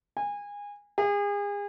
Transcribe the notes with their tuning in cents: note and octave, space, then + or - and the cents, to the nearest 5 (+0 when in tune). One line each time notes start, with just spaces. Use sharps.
G#5 -25
G#4 -35